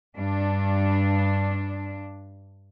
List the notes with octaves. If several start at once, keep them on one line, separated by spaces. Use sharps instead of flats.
G2 D4